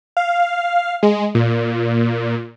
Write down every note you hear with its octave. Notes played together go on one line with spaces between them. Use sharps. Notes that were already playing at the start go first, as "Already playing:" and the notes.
F5
G#3
A#2